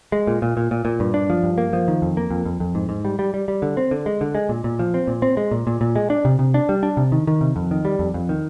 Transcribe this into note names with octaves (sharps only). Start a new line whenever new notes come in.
G#3
A#2
A#2
A#2
A#2
A#2
G2
D4
F3
G2
A#3
F3
D#3
F2
A#3
F2
F2
F2
G#2
G#2
G3
G3
G3
G3
D3
C4
D3
G#3
D3
G#3
A#2
A#2
F3
C4
A#2
C4
G#3
A#2
A#2
A#2
G#3
D4
C3
C3
D4
G3
D4
C3
D#3
D#3
C3
F2
D#3
G3
F2
F2
D#3